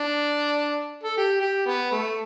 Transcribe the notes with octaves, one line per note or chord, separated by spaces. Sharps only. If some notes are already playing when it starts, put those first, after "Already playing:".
Already playing: D4
A4
G4
G4
B3
A3